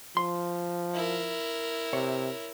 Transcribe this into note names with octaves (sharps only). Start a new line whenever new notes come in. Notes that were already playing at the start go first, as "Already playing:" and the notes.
F3 C6
E4 A#4
C3 C#5